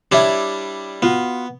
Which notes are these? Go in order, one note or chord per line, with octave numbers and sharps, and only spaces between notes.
G3 D4 E4 C#5 E5
B3 F4 F#4